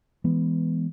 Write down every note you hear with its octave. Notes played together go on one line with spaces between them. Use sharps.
E3 G#3 B3